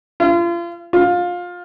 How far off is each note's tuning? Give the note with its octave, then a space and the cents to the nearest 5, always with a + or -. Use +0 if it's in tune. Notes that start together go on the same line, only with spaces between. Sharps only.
F4 -35
F4 +20